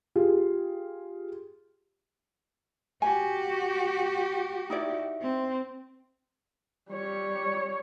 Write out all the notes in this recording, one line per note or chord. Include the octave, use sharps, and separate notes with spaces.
F4 G4 G#4
F#4 G4 G#5
D#4 E4 D5
C4
G3 C#5